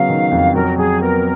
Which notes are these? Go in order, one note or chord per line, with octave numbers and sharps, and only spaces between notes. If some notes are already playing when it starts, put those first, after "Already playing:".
Already playing: C#3 F#3 B3 F5
D#3
F2
F#3 A#4
F#3 G#4
B3 A#4